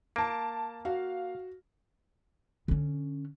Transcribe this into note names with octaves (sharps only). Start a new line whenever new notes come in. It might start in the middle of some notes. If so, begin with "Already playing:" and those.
A#3 A5 D7
F#4 F5
D3 C#4